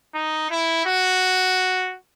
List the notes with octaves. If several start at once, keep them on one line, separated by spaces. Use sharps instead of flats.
D#4
E4
F#4